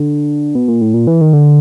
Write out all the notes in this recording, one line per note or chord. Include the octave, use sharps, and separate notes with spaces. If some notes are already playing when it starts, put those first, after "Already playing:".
Already playing: D3
B2
A#2
A2
A#2
E3
D#3
D3